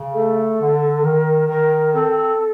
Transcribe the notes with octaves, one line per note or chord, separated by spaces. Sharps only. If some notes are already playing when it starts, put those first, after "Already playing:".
Already playing: C#3
A3 A4
D3
D#3 A#4
D#3 A#4
C4 A4